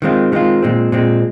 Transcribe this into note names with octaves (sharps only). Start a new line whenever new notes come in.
D#3 G#3 C4 F4
D#3 G#3 C4 F4
A#2 G#3 C4
A#2 G#3 C4